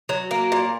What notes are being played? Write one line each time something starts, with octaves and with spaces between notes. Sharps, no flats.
F#3
A#3
A#2